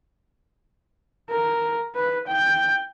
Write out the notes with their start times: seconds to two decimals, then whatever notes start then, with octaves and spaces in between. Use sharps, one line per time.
1.30 A#4
1.96 B4
2.27 G5